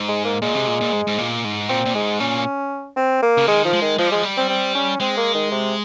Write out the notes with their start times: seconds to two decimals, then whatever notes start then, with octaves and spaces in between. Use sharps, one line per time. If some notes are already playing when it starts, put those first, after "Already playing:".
Already playing: G#2
0.08 G#3
0.25 A#3
0.42 A#2 G#3
0.54 C3
0.68 A#2
0.81 A#2
0.93 G#2
1.07 G#2
1.18 A#2
1.44 G#2
1.69 A#2 C4
1.85 A#2
1.95 G#2 G#3
2.20 A#2 C#4
2.97 C4
3.23 A#3
3.38 C#3
3.47 D#3 G#3
3.65 F3
3.73 G#3
3.82 D#3
3.98 F3 G#3
4.07 G3
4.11 F3 G#3
4.23 G3
4.37 C4
4.50 C4
4.75 C#4
5.00 G#3 C4
5.17 A#3
5.34 D#3
5.51 C3